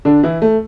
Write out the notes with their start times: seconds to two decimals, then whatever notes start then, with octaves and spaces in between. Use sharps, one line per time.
0.05 D3 D4
0.23 E3 E4
0.42 A3